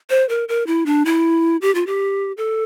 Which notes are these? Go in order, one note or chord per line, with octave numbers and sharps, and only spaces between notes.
C5
A#4
A#4
E4
D4
E4
G4
F4
G4
A4